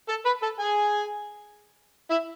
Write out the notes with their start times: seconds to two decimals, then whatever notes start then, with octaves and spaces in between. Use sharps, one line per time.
0.09 A4 A5
0.25 B4 B5
0.43 A4 A5
0.59 G#4 G#5
2.10 E4 E5